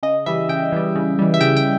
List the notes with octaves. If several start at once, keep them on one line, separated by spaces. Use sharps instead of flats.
C#3 D#5
E3 G3 E5
C#3 G5
E3 G3
C#3
E3 G3
E5
C#3 G5
G5